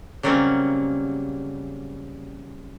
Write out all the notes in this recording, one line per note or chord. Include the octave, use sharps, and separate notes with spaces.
C#3 F#3 G3 A#3 C4 C#4